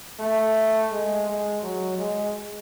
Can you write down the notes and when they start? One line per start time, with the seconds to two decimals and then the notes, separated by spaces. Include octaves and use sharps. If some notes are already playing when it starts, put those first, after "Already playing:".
0.19 A3
0.91 G#3
1.26 G#3
1.62 F#3
1.98 G#3